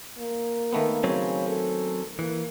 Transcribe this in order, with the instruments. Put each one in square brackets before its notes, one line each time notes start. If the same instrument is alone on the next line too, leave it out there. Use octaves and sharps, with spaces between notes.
[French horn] A#3
[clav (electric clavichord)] D#3 A3 B3
[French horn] C#3 [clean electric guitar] F#3 C4 C#4
[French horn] A4
[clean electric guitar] E3 [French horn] A#3